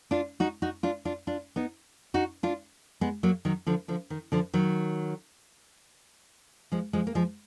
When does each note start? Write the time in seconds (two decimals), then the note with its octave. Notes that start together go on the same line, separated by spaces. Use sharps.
0.11 D4 F4
0.40 D#4 F#4
0.62 D#4 F#4
0.83 D4 F4
1.05 D4 F4
1.27 D4 F4
1.56 B3 D#4
2.14 D#4 F#4
2.43 D4 F4
3.01 G#3 B3
3.23 F#3 A#3
3.45 D#3 F#3
3.67 D3 F3
3.88 D3 F3
4.10 D#3
4.32 D3 F3
4.54 D#3 F#3
6.72 F3 G#3
6.93 F3 G#3
7.07 A#3
7.15 F3 G#3